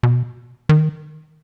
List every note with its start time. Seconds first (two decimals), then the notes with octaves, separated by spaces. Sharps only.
0.03 B2
0.69 D#3